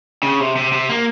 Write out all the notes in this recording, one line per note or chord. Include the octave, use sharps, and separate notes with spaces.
C#3
C3
C3
C3
A#3